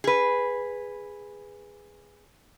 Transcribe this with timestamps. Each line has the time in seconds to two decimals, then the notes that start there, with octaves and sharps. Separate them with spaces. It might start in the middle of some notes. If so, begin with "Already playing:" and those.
0.04 G#4 B4